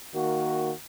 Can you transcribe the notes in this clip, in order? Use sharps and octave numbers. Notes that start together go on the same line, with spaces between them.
D#3 A#3 F#4